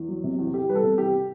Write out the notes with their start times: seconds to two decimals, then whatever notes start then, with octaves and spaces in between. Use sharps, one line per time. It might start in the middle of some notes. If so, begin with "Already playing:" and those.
Already playing: E2
0.08 F#3
0.24 C3
0.39 E2
0.53 E2 G4
0.68 G3 B4
0.75 A4
0.83 C3
0.97 E2 G4